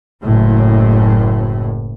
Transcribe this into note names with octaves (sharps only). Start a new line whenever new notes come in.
F#1 A2